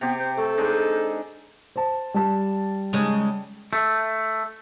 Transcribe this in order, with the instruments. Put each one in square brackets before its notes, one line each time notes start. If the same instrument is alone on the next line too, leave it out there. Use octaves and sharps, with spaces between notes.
[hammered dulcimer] C3 G4 [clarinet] B3
[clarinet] C5
[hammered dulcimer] A3 [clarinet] A4
[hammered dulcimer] G#3 D4 D#4
[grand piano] C5 A5
G3 A5
[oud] C#3 G#3 D#4
[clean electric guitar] A3